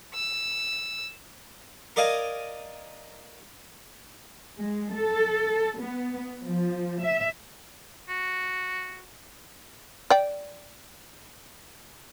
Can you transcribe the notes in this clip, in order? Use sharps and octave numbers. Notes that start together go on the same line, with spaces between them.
E6
A#4 D5 D#5 F5 G#5 A#5
G#3
A4
B3
F3
E5
F#4
D5 G5